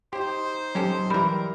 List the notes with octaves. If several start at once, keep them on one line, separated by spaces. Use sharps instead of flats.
D#4 G4 C5
F#3 C#4 G4 A4
E3 G3 G4 A#4 B5